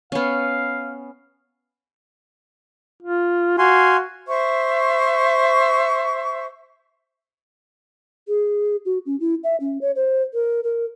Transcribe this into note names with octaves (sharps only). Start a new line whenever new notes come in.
B3 C#4 F5
F4
F#4 F5 G#5 C6
C5 E5 C#6
G#4
F#4
C#4
E4
E5
C#4
C#5
C5
A#4
A#4